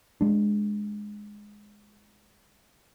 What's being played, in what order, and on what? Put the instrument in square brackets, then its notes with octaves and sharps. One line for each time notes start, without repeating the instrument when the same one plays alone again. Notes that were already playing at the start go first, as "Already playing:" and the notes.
[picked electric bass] G#3 D4